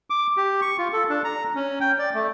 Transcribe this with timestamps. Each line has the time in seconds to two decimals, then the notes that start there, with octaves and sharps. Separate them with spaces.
0.10 D6
0.37 G4
0.61 C#6
0.78 F4
0.93 A4
1.10 D4
1.24 A#5
1.55 C#4
1.81 G5
1.99 D5
2.14 A3